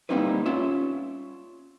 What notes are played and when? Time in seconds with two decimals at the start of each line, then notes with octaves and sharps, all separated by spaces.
0.09 G3 A#3 C4 D#4 E4 B4
0.46 C#4 F4 E5